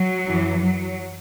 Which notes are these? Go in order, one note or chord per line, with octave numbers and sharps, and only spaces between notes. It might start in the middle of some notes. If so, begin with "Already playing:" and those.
Already playing: F#3
F#2 E3
F#3